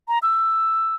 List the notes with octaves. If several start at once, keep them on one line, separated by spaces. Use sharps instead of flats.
A#5
E6